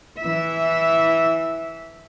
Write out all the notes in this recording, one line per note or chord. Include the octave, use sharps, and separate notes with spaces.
E3 E5